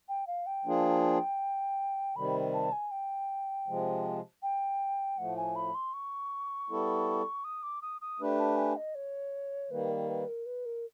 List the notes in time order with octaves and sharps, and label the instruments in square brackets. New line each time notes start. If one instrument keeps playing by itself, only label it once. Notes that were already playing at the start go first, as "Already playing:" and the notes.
[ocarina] G5
F5
G5
[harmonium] F3 A#3 D4 F4 G#4
[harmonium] C3 D#3 G3 [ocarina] B5
[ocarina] A5
G#5
G5
[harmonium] C3 F3 G#3
[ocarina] G5
[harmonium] A2 F3 A3 [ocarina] F#5
[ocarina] G#5
B5
C6
C#6
[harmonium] G3 B3 E4 A4
[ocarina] D#6
D6
D#6
D#6
[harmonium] A3 D4 G4 B4
[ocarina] A5
G#5
D#5
C#5
[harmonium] D#3 G3 A#3 [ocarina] B4
[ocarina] A#4
B4
A#4
B4
A#4